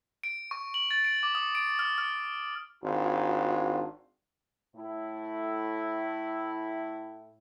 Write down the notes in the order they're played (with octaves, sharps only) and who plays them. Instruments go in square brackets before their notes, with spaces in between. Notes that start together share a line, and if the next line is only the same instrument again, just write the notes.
[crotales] D7
C#6
F#7
A6
D7
D6
D#6
D7
F6
F6
[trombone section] G#1 D4 F4 F#4
A2 E4